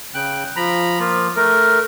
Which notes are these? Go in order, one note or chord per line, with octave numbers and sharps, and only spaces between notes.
C#3 G5 F#6
F3 A#5 B5
F3 A#3 F4
A3 A#4